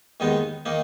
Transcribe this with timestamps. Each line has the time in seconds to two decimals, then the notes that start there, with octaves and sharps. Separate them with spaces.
0.20 D#2 D#3 G#3 B3 D#4
0.66 D#3 A#3 D#4